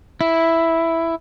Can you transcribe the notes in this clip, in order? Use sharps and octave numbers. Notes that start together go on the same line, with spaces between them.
E4